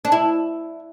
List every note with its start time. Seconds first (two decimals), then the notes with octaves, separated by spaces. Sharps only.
0.05 D4
0.12 E4